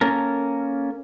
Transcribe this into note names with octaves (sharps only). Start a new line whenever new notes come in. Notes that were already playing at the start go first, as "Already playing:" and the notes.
A#3 C#4 A4 A#4